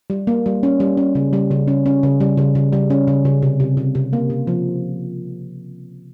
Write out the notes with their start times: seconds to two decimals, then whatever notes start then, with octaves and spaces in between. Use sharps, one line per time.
0.10 G3
0.27 A#3
0.46 G3
0.63 C#4
0.80 G3
0.97 C#4
1.15 C#3
1.33 G3
1.51 C#3
1.68 C#4
1.86 C#4
2.03 C#3
2.20 G3
2.38 C#3
2.55 C#3
2.73 G3
2.90 C#4
3.08 C#3
3.25 C#3
3.43 C3
3.60 C3
3.77 C3
3.95 C3
4.13 A#3
4.30 C3
4.47 F3